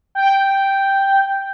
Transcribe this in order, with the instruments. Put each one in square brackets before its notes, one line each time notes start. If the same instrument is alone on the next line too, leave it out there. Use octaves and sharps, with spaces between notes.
[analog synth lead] G5